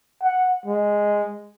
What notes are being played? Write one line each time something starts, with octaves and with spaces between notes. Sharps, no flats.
F#5
G#3